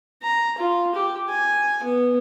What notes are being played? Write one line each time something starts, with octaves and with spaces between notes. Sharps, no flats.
A#5
F4
G4
G#5
B3